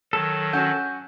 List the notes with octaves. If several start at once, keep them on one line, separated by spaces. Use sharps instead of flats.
D#3 F#3 A4
C#4 F#4 G6